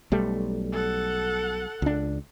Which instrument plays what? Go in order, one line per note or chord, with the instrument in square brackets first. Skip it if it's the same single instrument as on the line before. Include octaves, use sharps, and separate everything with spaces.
[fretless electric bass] B1 G3 A3
[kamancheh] A4 F#5
[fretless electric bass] C#2 D4